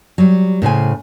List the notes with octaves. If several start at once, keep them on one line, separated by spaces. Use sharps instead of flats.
F#3 G3
A2 C#3 C5 G#5